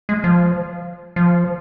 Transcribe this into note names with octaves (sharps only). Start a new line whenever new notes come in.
G#3
F3
F3